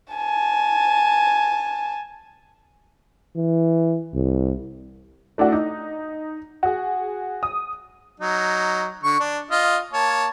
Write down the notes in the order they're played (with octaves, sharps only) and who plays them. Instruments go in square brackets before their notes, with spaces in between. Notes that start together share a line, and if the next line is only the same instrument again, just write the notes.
[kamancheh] G#5 A5
[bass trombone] E3
C2
[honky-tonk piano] A3 D4 E4 F#4
D#4
F#4 G#4
D#6
[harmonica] F#3 D#4
D3 C#6
D4
F4 D#5
A#3 C#5 A5